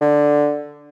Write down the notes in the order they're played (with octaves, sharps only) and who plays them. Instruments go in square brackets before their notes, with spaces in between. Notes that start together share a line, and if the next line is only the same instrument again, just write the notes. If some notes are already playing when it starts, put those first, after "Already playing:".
[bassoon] D3